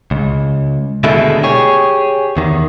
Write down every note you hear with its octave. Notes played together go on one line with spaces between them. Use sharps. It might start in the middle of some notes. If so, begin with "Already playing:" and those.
C#2
B2 D3 D#3 G#3 A3 E4
G4 G#4 C#5
E2 D#3